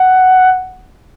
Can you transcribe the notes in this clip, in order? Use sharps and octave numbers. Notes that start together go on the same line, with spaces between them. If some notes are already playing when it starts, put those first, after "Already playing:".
Already playing: F#5